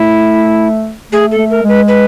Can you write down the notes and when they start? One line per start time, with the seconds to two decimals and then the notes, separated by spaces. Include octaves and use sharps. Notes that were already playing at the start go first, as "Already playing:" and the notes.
Already playing: A3 E4
1.12 A3 G#4
1.31 A4
1.38 A3
1.51 A#4
1.62 G#3
1.68 B4
1.88 B4